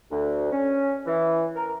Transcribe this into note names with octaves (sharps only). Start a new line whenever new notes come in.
D2
C#4
E3
A#4